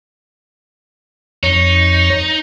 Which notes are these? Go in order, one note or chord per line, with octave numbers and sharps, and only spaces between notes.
F2 D#4 C#5 C#6